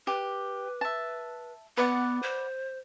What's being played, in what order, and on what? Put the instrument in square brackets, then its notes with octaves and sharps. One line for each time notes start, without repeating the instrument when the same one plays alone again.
[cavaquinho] G4 [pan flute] B4
[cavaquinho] E5 A5
[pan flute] B3 [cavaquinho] B4 D5 F#5
[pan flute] C5